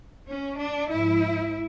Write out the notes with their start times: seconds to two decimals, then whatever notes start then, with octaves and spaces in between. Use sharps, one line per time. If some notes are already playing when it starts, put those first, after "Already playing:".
0.26 C#4
0.57 D4
0.89 G#2 F3 E4